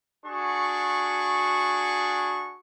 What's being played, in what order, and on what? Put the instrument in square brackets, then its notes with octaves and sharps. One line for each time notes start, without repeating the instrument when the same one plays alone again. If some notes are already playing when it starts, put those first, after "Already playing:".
[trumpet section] D4 F#4 G#4 C#6